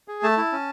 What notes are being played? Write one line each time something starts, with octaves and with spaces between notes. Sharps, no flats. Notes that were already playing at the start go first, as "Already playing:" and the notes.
G#4
A3 A5
E4
C#4